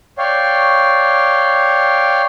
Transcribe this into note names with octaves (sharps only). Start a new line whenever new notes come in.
C#5 D5 F5 G5